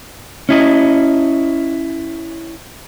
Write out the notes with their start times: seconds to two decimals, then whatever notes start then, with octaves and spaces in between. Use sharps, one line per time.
0.49 C#4 E4 D#5